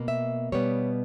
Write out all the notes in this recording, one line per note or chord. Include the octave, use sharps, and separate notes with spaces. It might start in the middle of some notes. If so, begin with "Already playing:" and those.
Already playing: B2 A#3
E5
B2 G3 B3 C#5